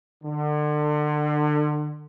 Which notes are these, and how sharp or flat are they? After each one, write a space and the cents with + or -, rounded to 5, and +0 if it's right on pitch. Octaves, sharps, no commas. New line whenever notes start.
D3 +30